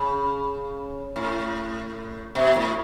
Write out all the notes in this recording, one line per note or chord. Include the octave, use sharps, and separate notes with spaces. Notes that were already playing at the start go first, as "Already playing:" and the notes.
Already playing: C#3
A2
B2
A2